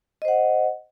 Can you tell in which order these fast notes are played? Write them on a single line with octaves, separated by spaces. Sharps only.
D#5 C5 F#5